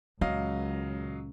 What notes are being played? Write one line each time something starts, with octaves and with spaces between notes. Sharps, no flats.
C#2 A#2 F#3 C#4 D#5 F5